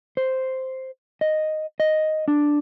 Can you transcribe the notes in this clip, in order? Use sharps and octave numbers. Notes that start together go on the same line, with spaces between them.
C5
D#5
D#5
D4